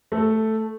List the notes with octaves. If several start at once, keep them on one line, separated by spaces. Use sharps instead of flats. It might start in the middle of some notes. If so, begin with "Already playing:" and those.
A3 A4